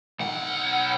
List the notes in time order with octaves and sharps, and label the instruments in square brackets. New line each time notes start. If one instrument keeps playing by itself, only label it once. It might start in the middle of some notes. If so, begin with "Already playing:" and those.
[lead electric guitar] B1 F#5